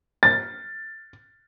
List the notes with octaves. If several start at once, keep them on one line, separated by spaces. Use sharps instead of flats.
A6